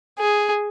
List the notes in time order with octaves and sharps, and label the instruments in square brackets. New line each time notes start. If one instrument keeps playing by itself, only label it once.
[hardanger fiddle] G#4